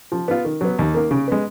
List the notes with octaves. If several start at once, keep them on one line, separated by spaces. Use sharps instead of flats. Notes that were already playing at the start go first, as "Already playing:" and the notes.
F3
B3 F4
D#3
F#3 B3
D#2
D#3 A#3
C#3
G#3 B3